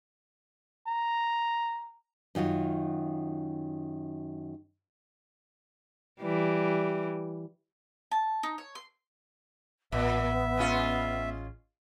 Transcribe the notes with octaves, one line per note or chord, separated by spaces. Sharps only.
A#5
F#2 D#3 F4 F#4
E3 G3
A5
D#4
C#5
C6
A1 A#2 B3 E5
G#3 C#4 F4